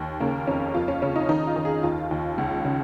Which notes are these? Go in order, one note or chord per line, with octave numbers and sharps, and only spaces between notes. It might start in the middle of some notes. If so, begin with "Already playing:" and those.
Already playing: D#2
C#3 A#3
F2 C#4
F2 F4
C#4
C#3 C#4
D#4
D#3 D#4
F4
D#3
G#4
D#2 F4
D#2
C#2
C#3